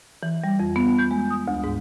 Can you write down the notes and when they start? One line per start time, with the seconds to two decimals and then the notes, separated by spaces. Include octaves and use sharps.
0.23 E3
0.44 G3
0.60 F2
0.76 B3
0.98 G6
1.11 G#3
1.30 D#6
1.48 D2
1.64 G#2